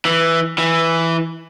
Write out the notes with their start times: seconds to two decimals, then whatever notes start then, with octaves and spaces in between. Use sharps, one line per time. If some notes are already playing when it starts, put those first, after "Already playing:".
0.05 E3
0.58 E3